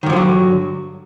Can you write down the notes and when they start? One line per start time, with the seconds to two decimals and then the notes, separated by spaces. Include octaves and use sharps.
0.03 D#3
0.06 G2
0.10 F3
0.13 D3
0.16 F#3